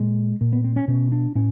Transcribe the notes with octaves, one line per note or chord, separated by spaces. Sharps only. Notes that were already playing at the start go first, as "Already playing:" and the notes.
Already playing: A#2 G#3
A#2
B3
C4
C#4
B2 C#4
D4
A2 C#4